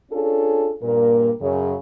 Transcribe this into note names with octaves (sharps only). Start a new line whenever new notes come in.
C#4 D4 F4 G#4 A4
G2 A#2 A#3 A#4
F#2 C#3